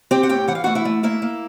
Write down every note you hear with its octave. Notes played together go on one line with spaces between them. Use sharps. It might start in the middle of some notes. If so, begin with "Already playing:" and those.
C4 G4 G5
F#5
A2 G4 G5
E3 F#5
F5
A3 F#4 F#5
E4 E5
A3
A#3 E4 E5
A#3